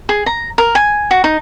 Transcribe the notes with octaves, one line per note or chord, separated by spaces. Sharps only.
G#4
A#5
A#4
G#5
F#4
D#4